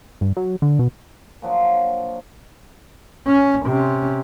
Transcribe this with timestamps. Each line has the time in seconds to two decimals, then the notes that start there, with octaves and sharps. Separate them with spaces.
0.21 G2
0.37 F#3
0.62 D3
0.79 B2
1.42 A#2 F3 F#3 D4
3.27 C#4
3.66 C3 C#4